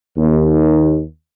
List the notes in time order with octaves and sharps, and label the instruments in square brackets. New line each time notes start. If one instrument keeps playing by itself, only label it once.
[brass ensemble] D#2